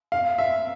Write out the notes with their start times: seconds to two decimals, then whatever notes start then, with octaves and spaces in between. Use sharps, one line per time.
0.12 F5
0.38 E5